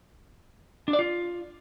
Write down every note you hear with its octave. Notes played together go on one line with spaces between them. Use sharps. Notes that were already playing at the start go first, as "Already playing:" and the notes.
D4
D5
F4